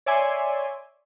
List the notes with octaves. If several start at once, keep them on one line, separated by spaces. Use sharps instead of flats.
C#5 D5 E5 G#5 C6